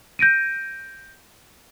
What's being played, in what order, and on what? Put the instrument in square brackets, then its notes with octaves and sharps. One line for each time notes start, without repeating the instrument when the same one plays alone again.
[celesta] G6 A#6 D7 D#7